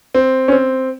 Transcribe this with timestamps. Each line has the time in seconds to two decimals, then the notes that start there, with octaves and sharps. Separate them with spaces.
0.15 C4
0.48 C#4
0.52 C4